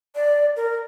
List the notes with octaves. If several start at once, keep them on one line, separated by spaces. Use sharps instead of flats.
D5
A#4